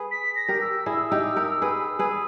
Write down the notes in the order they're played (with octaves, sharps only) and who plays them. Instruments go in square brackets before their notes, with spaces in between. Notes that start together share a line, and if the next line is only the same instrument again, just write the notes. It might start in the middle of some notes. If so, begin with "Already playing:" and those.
Already playing: [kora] G#4 B4
[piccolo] B6
A#6
[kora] G4 A#4
[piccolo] E6
[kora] E4 G#4
D#4 G4
G4 A#4
G#4 B4
G#4 B4